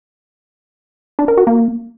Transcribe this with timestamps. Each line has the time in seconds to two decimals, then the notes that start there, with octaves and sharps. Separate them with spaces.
1.19 D4
1.28 A#4
1.38 F#4
1.47 A#3